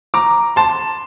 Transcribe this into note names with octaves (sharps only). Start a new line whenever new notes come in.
A#5 D6
A5 C6